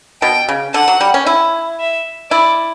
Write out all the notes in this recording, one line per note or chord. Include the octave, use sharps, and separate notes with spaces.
B2 G5
C#3
D3 F#5
F#3
G3
C#4
E4
E5
E4 D5